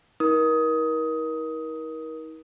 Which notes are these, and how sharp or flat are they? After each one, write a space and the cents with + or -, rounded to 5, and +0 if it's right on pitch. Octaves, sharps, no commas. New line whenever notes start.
D#4 +45 A#4 +30 D#6 +15